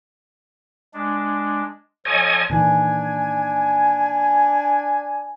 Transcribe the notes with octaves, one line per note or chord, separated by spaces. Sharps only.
G#3 D4
F3 A4 C#5 D#5 G#5
A#2 D#3 E3 D4 G#5